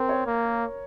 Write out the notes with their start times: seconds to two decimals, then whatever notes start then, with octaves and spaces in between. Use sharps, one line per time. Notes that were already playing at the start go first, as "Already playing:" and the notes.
Already playing: C4 A#4
0.09 C#5
0.27 A#3